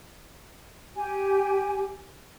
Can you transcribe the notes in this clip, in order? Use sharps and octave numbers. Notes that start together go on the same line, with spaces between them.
G4 G#5